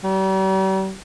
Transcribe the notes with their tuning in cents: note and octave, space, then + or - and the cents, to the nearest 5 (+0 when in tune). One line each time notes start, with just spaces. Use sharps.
G3 -40